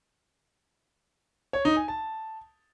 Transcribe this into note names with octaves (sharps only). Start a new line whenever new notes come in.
C#5
D#4
G#5
A5